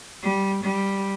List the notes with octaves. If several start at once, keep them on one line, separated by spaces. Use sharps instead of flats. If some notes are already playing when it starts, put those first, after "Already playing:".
G3
G3